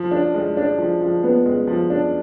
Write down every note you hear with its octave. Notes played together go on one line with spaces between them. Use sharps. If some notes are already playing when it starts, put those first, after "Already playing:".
Already playing: F3
D4
G#3
D4
F3
F3
B3
G#3
F3
D4